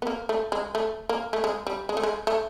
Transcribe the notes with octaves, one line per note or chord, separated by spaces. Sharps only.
B3
A#3
A3
G#3
A3
A#3
A3
G#3
G3
G#3
A3
G#3
A3